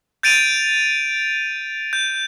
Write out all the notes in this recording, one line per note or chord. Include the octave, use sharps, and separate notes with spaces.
G6 A6 D7 D#7 F7
G6